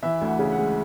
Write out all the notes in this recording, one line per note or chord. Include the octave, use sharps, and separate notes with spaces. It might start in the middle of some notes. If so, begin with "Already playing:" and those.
E3 E5
D2
F#5
C#3
F#5
G#3